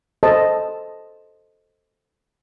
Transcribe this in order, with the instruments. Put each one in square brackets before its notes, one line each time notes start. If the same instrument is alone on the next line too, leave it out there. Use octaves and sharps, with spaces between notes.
[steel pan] A4 C5 D#5 A5